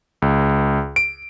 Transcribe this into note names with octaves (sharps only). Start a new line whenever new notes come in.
C#2
D7